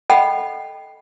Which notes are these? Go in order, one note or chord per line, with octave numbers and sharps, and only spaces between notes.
A4 D#5 F#5 G5 B5